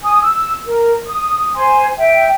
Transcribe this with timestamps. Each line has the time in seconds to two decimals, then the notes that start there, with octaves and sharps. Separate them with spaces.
0.03 G#5 D#6
0.22 E6
0.65 A#4
1.06 D#6
1.55 C5 G#5 C6
1.98 E5 G5